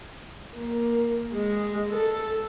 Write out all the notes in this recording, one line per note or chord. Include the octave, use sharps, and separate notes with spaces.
A#3
G#3
A4